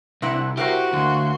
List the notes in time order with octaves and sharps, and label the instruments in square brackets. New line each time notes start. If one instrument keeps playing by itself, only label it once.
[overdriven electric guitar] C2 [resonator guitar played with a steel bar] C3 E4 F#5
[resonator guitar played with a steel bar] E4 A#4 C5 [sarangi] F#4 [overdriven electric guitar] G4
[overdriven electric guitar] D2 [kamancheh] A#3 C6